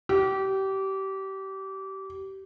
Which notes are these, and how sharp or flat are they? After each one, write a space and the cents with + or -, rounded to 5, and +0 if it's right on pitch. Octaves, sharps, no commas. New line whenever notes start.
G4 -25